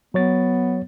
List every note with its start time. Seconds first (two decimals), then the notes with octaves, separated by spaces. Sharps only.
0.14 F#3 B3 C#5 A6